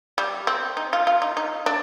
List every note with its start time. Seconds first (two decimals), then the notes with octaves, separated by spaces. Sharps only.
0.18 G3
0.47 C4
0.77 D#4
0.93 F4
1.07 F4
1.22 D#4
1.37 D#4
1.66 D4